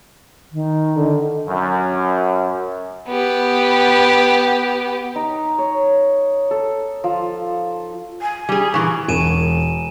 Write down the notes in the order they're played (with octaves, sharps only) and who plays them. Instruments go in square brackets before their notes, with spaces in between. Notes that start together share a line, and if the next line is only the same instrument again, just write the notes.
[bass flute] D#3
[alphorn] D3
[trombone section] F#2
[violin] B3 G4
[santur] D#4
C#5
A4
F3
[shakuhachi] G#5
[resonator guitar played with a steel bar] G3 G#4
[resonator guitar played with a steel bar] A#2 E3 [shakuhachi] C#6
[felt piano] E1 [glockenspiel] G#5 D#7 E7